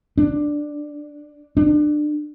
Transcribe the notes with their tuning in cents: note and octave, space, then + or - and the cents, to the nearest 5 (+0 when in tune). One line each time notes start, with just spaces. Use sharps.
D4 +5
D4 +25